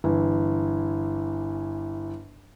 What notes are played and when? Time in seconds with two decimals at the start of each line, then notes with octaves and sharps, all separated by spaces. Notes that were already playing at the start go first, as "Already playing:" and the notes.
0.04 G1 E3